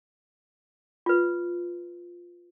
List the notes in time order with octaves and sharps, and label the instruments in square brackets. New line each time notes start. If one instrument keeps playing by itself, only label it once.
[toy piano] F4 B4